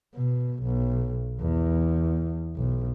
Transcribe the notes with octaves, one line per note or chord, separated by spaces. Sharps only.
B2
B1
E2
B1